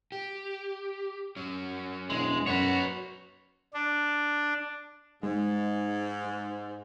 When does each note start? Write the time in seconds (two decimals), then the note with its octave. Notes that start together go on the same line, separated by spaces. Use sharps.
0.12 G4
1.36 F#3 C#4
2.10 E1 G#3
2.47 F#2 F#4 B4 C#5
3.74 D4
5.23 G#2 G#3